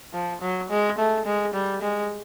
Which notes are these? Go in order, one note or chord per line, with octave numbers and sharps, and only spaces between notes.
F3
F#3
G#3
A3
G#3
G3
G#3